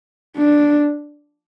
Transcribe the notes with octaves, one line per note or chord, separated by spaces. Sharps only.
D4